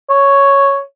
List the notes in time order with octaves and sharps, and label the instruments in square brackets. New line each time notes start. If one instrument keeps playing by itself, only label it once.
[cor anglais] C#5